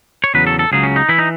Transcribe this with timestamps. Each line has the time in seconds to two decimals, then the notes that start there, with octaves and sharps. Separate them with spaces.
0.24 C#5
0.34 E2 C#3 F#3 B4
0.47 A4
0.59 A4
0.72 C#2 C#3 F#3 G#4
0.83 C#4
0.96 D#4
1.09 E3 E4
1.18 D#4